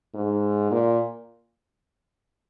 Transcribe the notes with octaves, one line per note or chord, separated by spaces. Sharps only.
G#2
A#2